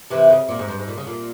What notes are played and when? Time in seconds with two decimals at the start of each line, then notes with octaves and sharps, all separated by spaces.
0.10 C3 E3
0.30 C#3
0.49 A#2
0.59 G#2
0.68 G2
0.79 G#2
0.88 A#2
0.98 C#3
1.07 A#2